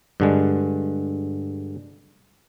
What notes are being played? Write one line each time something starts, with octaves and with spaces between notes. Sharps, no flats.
G2 D3 G#3